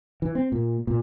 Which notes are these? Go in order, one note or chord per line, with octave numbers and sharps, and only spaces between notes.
E3
C4
A#2
A#2